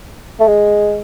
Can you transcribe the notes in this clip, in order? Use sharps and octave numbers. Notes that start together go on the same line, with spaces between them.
A3
G#3